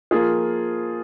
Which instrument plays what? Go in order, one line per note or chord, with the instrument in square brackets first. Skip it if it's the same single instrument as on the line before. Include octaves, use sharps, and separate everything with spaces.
[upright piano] F3 A#3 F4 G#4